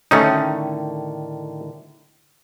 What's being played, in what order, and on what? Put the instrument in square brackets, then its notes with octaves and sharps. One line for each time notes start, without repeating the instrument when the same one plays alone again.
[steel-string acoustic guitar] A2 D3 D#3 [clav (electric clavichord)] A3 C#4 D#4